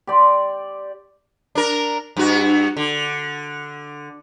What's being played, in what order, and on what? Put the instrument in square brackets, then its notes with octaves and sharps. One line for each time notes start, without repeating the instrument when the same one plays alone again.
[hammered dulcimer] G4 D5 C6
[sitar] D4 A#4
G2 F#4
D3